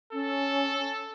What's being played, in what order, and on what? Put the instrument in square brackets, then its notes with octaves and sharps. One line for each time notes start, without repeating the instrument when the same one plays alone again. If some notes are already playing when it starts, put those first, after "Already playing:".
[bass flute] C#4 [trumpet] A4